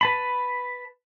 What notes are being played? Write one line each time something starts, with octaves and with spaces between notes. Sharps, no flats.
B4 A5 B5